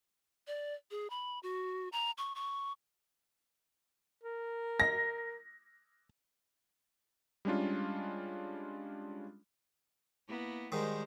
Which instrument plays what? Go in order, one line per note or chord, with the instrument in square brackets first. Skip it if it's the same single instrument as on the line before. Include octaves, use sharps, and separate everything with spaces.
[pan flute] D5
G#4
B5
F#4
A#5
C#6
C#6
[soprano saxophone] A#4
[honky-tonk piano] A#6
[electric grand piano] G3 G#3 C#4 D4 F4
[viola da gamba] A#3 B3 E4
[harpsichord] G#2 D#3 [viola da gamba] G3 G#3 C5